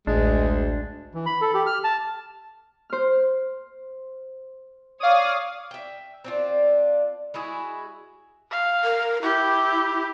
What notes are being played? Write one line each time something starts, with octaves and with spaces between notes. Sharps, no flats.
A1 D2 G#3 D4
E3
B5
A4
G4
F6
A5
C5 F6
C#5 D5 F5 D#6
E5 G5
C4 D4 F4
G#3 E4 F#4 G#4
F5
A#4
E4 G4